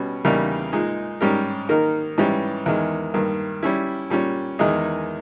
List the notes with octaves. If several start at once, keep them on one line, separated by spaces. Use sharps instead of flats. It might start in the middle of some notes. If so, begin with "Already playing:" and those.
Already playing: B2 G3 C#4
E2 C#3 G3 A#3 D#4
A#2 G#3 D#4
G#2 G3 C#4 G4 A#4
D#3 A#3 D#4 A#4
G#2 E3 G3 C#4 G4
E2 D#3 G#3
G2 D#3 A#3
G3 C#4 E4
A#2 G3 C#4
E2 D#3 G#3 D#4 G#4